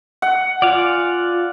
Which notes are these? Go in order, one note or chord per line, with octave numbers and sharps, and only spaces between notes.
F#5
F4 D5 F5 G#5